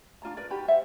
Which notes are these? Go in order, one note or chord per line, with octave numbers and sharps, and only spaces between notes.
D4 F4 D5 A#5
A#4 B4 D5
D#4 F#4 G4 B5
C5 E5 F#5